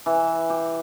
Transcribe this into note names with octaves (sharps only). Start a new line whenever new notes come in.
E3
G4